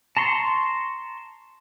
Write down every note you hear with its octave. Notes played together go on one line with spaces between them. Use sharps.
A5 A#5 C6 C#6